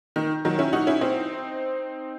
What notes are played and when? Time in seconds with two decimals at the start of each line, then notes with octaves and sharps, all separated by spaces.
0.16 D#3
0.45 D#3 F#3
0.59 C#4 E4
0.73 D#4 F#4
0.87 C#4 E4
1.01 C4 D#4